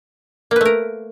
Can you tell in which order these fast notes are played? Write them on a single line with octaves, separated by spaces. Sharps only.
A#3 B4 A3 A#4